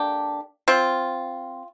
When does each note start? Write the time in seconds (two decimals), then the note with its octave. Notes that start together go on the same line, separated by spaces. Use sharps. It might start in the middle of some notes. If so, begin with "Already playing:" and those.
Already playing: D3 A#3 D4 G4
0.68 C4 F4